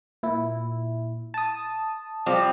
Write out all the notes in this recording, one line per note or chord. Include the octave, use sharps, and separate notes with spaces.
A#2 E4
A5 D#6
F3 G3 C4